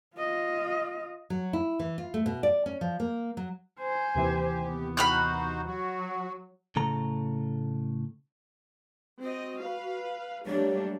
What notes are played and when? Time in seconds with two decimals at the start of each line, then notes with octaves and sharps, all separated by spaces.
0.16 F4 D#5
1.30 F#3
1.53 E4
1.79 E3
1.98 F4
2.14 A3
2.26 B2
2.43 D5
2.66 C#4
2.81 F3
3.00 A#3
3.37 F#3
3.80 C5 G#5
4.15 D#2 C3 E3 G4
4.67 B3
4.97 D#4 F#4 C5 B5 F6 F#6
5.66 F#3 F#4
6.76 A2 C#3 A3 A#5
9.22 C4 F#4 D#5
9.61 B4 F5
10.46 F#3 G3 A3 A#3 D4 G4 C#5